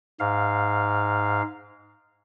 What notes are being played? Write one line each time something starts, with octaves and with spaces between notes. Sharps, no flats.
G#2 F5